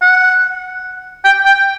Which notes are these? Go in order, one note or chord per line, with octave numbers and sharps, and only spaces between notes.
F#5
G5
G5